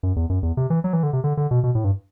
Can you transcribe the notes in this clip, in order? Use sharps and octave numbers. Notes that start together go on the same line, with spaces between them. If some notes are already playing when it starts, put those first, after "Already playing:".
F#2
E2
F#2
E2
C3
E3
F#3
E3
D3
C3
D3
D3
B2
B2
A2
G2